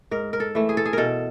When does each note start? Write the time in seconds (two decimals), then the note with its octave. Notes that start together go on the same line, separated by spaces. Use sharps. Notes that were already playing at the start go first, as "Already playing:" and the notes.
0.11 G#2 A#4
0.33 A#4
0.40 A4
0.55 E3 A3
0.69 G#4
0.77 A4
0.85 G#4
0.93 B2 A4 A#4